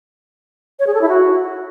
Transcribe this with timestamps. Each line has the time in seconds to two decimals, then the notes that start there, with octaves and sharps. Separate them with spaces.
0.79 C#5
0.87 G#4
0.94 A4
1.01 E4
1.09 F#4